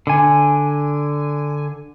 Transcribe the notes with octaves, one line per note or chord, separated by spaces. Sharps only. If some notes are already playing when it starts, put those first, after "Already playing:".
D3 G#5